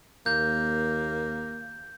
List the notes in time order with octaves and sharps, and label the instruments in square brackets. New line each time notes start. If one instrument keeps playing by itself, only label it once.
[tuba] D#2 [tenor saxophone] A#3 [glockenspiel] G6